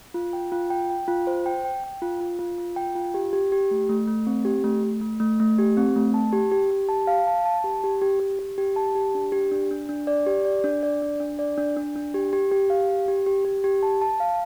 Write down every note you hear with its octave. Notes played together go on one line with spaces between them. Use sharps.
F4
G5
F4
G5
G5
F4
C5
G5
G5
G5
F4
F4
F4
F4
G5
F4
G4
G4
G4
A3
A3
A3
C4
G4
A3
A3
A3
A3
A3
G4
C4
A3
A5
G4
G4
G4
A5
F5
A5
A5
G4
G4
G4
G4
G4
G4
A5
G4
D4
G4
D4
D4
D4
D5
G4
D5
D4
D5
D4
D4
D5
D4
D4
D4
G4
G4
G4
F5
G4
G4
G4
G4
G4
A5
A5
F5